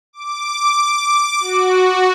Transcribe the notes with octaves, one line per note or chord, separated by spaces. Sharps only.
D6
F#4